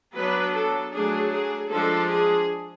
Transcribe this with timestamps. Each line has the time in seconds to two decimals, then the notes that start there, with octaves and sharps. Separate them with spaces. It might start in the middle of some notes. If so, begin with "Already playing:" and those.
0.16 F#3 B3 D4 B4
0.54 A4
0.93 F#3 A3 D4 G#4
1.32 G#4
1.70 F3 G#3 D4 A4
2.08 G#4